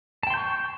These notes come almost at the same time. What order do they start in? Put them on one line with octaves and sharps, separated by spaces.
A5 G5 C6 G6 C#6